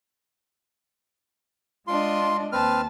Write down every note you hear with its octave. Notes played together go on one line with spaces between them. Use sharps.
G#3 D4 F4 D#5 C6
D#2 C4 B4 A5 F6